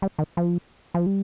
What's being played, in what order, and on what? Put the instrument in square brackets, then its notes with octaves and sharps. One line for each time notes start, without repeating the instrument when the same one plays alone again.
[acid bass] G3
D#3
F3
F3
G3